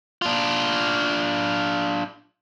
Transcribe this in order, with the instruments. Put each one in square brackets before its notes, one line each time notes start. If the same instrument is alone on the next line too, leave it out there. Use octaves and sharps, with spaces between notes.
[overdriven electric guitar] D4 F4